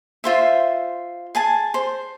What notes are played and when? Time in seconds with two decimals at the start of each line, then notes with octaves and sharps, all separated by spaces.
0.24 F4 C5 E5
1.35 G#4 G#5 A5
1.74 C5